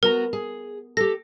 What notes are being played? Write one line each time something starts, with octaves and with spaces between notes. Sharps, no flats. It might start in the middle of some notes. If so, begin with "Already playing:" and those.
B3 F#4 A#4 A#5
G#4
G4 A4 A#6